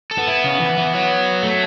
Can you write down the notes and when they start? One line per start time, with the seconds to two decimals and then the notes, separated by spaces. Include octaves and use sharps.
0.11 A4
0.19 B3
0.27 E4
0.44 C#3
0.60 E3
0.77 E3
0.94 F#3
1.43 A3